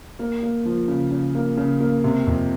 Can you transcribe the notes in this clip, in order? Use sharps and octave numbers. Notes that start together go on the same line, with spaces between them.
A#3
A#3
F3
C#3
C#3
A#3
C#3
A#3
C3
F2